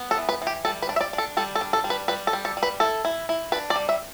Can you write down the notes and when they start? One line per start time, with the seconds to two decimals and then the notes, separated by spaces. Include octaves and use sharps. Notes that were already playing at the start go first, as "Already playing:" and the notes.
Already playing: B3
0.11 A4
0.18 E3
0.29 B4
0.42 E3
0.47 G4
0.65 G3 A4
0.82 B4
0.89 D4
0.96 E5
1.01 D5
1.13 D4
1.18 A4
1.37 G3 A4
1.55 A4
1.61 D4
1.73 A4
1.84 G3
1.90 B4
2.08 G3 B4
2.27 A4
2.33 G3
2.45 A4
2.57 G3
2.63 B4
2.80 E4 A4
3.05 E4
3.29 E4
3.52 D4 B4
3.70 D5
3.76 G3
3.89 E5